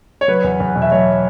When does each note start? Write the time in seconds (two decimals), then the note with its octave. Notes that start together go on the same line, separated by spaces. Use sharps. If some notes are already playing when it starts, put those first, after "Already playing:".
0.21 C#5
0.28 F#3 B4
0.44 E2
0.60 E2
0.76 B2
0.82 E5
0.92 F#3 C#5